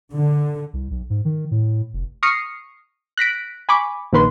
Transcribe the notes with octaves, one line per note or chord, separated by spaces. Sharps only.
D3
C2
B1
G#2
D#3
A2
F1
C#6 D#6 F6 A#6 C7 C#7
F#6 A#6 B6 D7
G#5 B5 C#6 D6
A#1 D#3 B4 C6